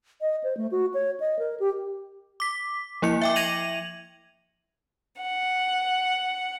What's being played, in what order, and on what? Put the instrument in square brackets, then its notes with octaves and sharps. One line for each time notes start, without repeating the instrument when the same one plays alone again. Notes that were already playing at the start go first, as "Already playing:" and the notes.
[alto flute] D#5
C5
A3
F#4
C#5
D#5
A#4
G4
[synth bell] D6 B6
F3 A#3 E4 C#7
E5 G5 D6
G#6 A#6 D#7 F7 F#7
[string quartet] F#5